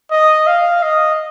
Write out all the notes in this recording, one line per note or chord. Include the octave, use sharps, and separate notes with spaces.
D#5
F5
D#5